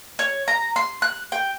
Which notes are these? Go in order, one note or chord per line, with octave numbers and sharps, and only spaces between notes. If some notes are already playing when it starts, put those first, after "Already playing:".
C#5
A#5
C6
F#6
G5